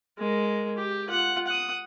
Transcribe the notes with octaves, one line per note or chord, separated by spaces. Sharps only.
G#3 A#4
G4
F4 F#5
F#5 D#6